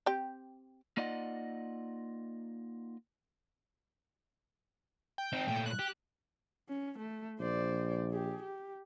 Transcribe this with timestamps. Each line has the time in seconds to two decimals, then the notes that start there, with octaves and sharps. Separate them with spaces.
0.06 C4 G4 G5
0.97 A#3 D#4 F4 D5 D#5 F#5
5.18 G5
5.33 C4 D#4
5.48 A#2 A3 G5
5.66 F#6
5.79 G4
6.69 C#4
6.98 A3
7.40 A#1 C5 D5
8.11 G4 G#4
8.42 G4